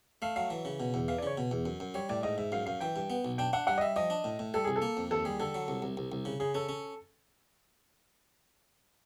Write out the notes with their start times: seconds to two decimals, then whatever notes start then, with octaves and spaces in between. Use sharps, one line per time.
0.22 A3 F5
0.36 F#3 F5
0.50 E3
0.65 C#3
0.80 B2
0.94 E2
1.08 E3 F5
1.18 D5
1.23 C#3 C#5
1.38 B2
1.51 E2
1.66 F#2
1.80 F#2
1.94 G3 C#5
2.09 A2 D5
2.23 G#2 D#5
2.37 G#2 E5
2.52 F#2 F5
2.66 F#2 F5
2.80 E3 G5
2.96 G2
3.10 B3
3.25 B1
3.38 D4 G5
3.53 D4 F#5
3.67 G3 F#5
3.78 D#5
3.81 G3 E5
3.96 F3 D#5
4.10 D4
4.24 A2
4.39 A2
4.54 G3 A4
4.64 C2 G#4
4.76 A4
4.82 A#3
4.97 F2
5.11 D#2 A4
5.25 G3 G#4
5.40 D3 A4
5.54 F#3
5.68 C2
5.82 C2
5.97 C2
6.12 C2
6.25 C#3
6.40 C#3 G#4
6.55 C#4 A4
6.69 C#4